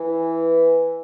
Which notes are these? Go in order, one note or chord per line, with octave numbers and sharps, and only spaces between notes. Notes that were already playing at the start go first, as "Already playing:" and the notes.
Already playing: E3